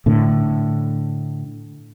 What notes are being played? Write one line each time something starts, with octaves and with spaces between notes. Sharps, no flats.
A2 D3